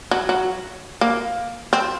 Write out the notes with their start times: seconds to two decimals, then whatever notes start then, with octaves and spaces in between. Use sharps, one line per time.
0.11 F#3
0.29 F#3
1.01 A#3
1.73 C4